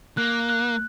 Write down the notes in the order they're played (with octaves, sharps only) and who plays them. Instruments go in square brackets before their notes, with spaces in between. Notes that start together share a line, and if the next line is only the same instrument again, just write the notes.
[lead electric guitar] A#3 [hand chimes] F#6
[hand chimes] F#6